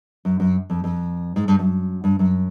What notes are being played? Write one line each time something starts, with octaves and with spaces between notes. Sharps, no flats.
F#2
F#2
F2
F2
G#2
G2
F#2
G2
F#2